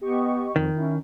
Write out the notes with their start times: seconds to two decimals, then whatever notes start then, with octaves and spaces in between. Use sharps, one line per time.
0.01 B3 G4 D#5 C#6
0.56 F2 D#3
0.76 C#4 E4